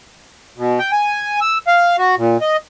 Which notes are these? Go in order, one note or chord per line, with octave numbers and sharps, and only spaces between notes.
B2
G5
G#5
E6
F5
F#4
A#2
D#5